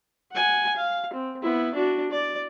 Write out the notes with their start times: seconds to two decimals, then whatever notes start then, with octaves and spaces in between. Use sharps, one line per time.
0.32 F#5 G#5
0.76 F5
1.13 C4
1.43 B3 E4
1.75 D4 F#4
2.11 D5